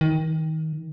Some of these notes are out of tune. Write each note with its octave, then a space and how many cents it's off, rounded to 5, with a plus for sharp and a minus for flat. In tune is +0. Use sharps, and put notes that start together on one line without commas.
D#3 +25